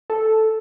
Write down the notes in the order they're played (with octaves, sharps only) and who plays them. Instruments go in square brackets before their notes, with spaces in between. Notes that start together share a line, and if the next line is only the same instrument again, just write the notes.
[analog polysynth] A4